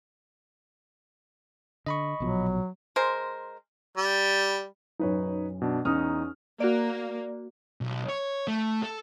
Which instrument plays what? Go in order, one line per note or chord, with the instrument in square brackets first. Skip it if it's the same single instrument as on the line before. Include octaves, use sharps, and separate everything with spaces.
[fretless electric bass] D3 [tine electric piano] D#5 B5 C#6
[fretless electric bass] A#1 B2 F3 [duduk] F#3
[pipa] G#3 A#4 C5
[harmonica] G3
[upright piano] B1 F#2 [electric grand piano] D#4 B4 C#5
[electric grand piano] B2 D4
[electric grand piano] E2 D#4 [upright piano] C#4 D#6 F6
[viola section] A#3 [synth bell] F#4 D5
[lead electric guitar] B1
C#5
A3
A4